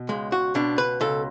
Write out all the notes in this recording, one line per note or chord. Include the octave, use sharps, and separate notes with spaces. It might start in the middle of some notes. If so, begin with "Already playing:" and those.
Already playing: B2
C#2 G#3
F#4
B2 D4
B4
C#2 A4